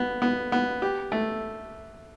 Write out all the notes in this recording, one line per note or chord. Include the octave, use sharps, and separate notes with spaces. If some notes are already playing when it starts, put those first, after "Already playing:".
Already playing: B3
B3
B3
G4
A3